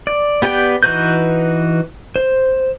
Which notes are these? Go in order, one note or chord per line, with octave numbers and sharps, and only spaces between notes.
D5
B3 G4 B4 D5 G5
E3 D#4 F#4 B4 G6
C5